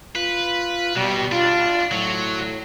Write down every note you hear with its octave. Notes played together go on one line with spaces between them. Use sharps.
F4 B4
B2 G3
D4 F4
A2 F#3